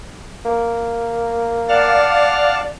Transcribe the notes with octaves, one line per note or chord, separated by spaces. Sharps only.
A#3
D5 F5 F#5 A5 F6